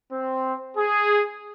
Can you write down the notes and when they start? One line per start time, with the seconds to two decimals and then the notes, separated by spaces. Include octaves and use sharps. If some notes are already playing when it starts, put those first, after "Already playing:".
0.12 C4
0.77 G#4